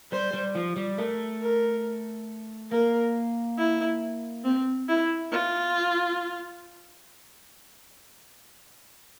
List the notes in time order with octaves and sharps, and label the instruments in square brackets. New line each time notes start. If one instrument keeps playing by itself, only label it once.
[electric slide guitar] G3 [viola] C5
[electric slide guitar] G3
F3
G3
[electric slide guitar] A3 [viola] A#4
[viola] A#4
[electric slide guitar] A#3 [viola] A#4
[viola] E4
C4
E4
F4